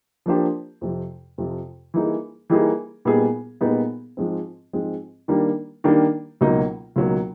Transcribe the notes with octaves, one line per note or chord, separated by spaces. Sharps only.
F3 A#3 D4 G4 C5
F2 C3 F3
F2 C3 F3
E3 G3 A#3 D#4 G#4
E3 G3 A#3 D#4 G#4
A#2 G3 B3 D#4 G#4
A#2 G3 B3 D#4 G#4
G#2 F3 G#3 C4
G#2 F3 G#3 C4
D#3 G3 A#3 D4
D#3 G3 A#3 D4
C#2 B2 F#3 A#3 D#4
C#2 B2 F#3 A#3 D#4